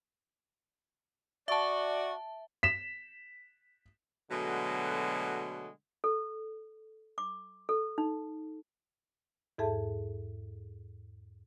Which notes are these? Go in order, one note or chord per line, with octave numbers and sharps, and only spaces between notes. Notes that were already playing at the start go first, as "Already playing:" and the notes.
F#4 D5 E5 A5
B6 E7
B2 D3 F#3 G#3 A3
A4
D6
A4
D#4
E2 G#2 G#4 A4 E5 A5